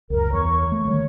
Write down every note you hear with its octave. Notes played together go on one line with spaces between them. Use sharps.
C#2 F#2 A#4
E2 C#5 C#6
A3
D3 D#3 G3 C#5